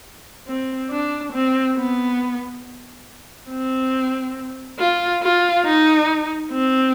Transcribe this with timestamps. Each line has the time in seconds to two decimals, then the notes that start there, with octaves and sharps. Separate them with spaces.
0.47 C4
0.90 D4
1.32 C4
1.77 B3
3.50 C4
4.79 F4
5.23 F4
5.66 D#4
6.51 C4